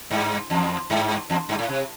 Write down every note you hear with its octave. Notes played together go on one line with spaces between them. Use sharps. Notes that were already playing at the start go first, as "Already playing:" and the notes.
G2
E2
G2
E2
G2
A2
C3